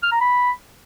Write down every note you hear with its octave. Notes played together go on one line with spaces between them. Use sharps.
F6
A#5
B5